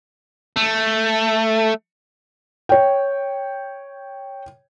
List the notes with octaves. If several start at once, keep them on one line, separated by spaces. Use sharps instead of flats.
A3
C#5 G5